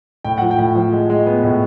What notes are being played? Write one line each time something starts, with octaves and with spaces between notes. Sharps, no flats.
A2 G5
F3 F#5
G5
A2
F3
G#3
G#3
B3
A2